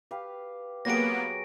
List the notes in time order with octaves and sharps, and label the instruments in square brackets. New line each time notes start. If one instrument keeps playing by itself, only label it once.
[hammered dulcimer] G4 B4 F5
[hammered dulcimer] F#3 G4 G#4 [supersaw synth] A#3 B3 [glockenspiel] A#6 D7